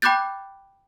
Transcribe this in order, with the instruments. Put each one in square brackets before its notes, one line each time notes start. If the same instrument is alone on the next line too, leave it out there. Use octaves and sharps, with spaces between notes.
[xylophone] G5 B5 D6 F#6 G6 A6